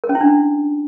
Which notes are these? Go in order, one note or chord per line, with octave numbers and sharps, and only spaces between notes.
A#4
C#4
E4
D4